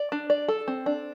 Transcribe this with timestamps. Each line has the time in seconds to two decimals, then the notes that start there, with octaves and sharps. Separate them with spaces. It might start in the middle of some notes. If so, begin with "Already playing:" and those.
Already playing: D5
0.12 D4
0.30 D5
0.48 A4
0.68 C4
0.86 D4